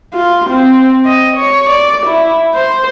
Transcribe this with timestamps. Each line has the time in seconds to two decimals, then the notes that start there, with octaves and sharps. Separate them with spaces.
0.13 F4
0.50 C4
1.05 D#5
1.37 C#5
1.70 D5
2.06 E4
2.55 C5